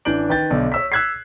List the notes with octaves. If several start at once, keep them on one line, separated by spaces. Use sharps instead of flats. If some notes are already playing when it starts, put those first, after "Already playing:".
A1 E3 D4 G6 D7 F#7
D#3 B4 G5 G6 A6
B1 D3 D5
C#5 E6 B6
E6 F#6 G#6 B6 C7